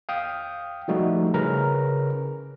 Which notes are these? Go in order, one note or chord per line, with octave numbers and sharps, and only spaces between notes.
F5 G5 D#6
F3 G3 A3 D#4 F#4
C#3 C#4 A#4 B4 A#5